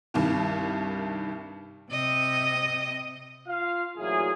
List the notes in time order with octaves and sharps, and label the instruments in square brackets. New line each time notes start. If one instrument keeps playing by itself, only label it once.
[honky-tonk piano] C2 G2 D#3
[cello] C3 D#5
[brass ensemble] F4 F5
A1 A#2 F#3 E4 G#4